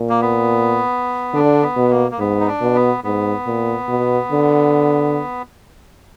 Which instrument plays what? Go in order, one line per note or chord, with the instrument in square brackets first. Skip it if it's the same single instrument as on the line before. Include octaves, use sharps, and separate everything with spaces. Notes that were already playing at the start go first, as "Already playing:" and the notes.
Already playing: [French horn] A#2
[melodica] A#3
B3
[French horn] D3 [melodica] D4
[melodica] B3
[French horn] B2
[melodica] A#3
A#3
[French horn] G#2 [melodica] B3
[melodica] D#4
D4
[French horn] B2
[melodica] B3
[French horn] G#2 [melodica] B3
[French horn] A#2
B2
D3